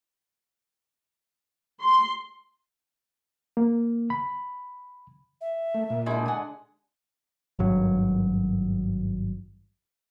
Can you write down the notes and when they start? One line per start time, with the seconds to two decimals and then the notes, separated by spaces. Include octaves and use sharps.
1.81 C6
3.57 A#3
4.10 B5
5.41 E5
5.74 A3
5.90 A#2
6.06 D3 G3 G#3 E4
6.26 F#5 G#5
7.59 G#1 G2 F#3